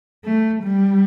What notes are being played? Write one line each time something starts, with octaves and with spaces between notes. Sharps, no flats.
A3
G3